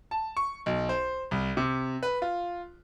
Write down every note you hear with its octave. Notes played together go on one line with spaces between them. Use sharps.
A5
C#6
B1
C5
C2
C3
B4
F4